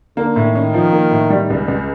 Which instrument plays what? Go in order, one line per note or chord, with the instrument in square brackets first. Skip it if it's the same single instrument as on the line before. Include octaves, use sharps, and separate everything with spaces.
[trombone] D3 [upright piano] A#3
[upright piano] A2
[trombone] D#3
[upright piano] C#4
F3
A#3
A2
G3
C#2
C#2